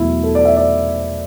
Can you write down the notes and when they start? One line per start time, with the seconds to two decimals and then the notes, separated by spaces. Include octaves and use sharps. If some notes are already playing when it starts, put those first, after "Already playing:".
Already playing: E2 B2 F#3 A3 E4
0.23 A4
0.35 D5
0.45 E5
0.56 D5